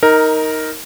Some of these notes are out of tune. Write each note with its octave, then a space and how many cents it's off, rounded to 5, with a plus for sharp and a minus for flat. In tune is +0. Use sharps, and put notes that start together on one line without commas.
D#4 +15 A#4 -5